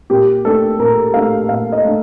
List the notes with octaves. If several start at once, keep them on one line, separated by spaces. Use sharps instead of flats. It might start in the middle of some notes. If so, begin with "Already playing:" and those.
A#2 G4
A3 D4 A4
A#2 A#4
A3 D4 F5
A#2 F5
D#5
A3 D4